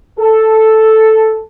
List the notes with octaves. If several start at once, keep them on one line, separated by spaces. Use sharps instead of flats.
A4